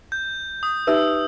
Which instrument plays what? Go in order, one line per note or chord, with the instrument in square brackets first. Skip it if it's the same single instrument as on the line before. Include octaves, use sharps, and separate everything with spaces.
[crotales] G6
D#6
[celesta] D#4 G4 B4 E5 [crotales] E6